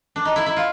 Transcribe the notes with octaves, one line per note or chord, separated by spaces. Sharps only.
D4
D#4
E4
E4
F4